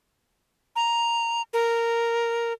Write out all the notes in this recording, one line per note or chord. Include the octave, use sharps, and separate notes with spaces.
A#5
A#4